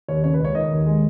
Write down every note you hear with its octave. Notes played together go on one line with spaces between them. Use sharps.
D#2 C#5
C#3 C#5
B4
C#2
C#5
D#3 D#5
D#2
G#3